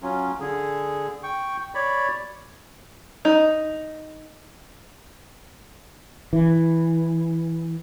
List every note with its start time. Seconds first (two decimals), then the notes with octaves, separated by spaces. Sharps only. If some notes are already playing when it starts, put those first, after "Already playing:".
0.03 F#3 C#4 F4
0.40 D3 G#4
1.23 G5 C#6
1.75 C#5 D5 B5
3.25 D#4
6.33 E3